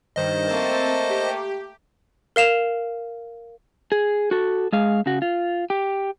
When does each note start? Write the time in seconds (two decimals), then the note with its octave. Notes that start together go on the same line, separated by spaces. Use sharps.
0.16 G2 D#3 C5 D#5
0.48 A3 A#3 C4 A5
1.09 G4
2.36 A#4 F5 E7 F7
3.92 G#4
4.31 F#4 A4
4.73 G#3 G#4 F5
5.06 C#3 F#4
5.22 F4
5.70 G4